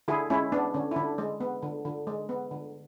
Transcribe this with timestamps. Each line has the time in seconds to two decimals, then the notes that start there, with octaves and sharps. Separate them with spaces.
0.08 D3 E4 G#4
0.30 G#3 C#4 E4
0.52 B3 D4
0.74 D3 C#4
0.91 E4
0.96 D3 D4
1.18 G#3
1.40 B3
1.63 D3
1.85 D3
2.07 G#3
2.29 B3
2.51 D3